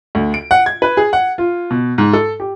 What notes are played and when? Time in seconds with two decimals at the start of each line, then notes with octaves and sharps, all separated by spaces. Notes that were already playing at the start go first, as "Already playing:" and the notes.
0.15 D2
0.34 D7
0.51 F#5
0.66 G#6
0.82 B4
0.97 G#4
1.13 F#5
1.38 F4
1.70 B2
1.98 G#2
2.13 A4
2.40 G4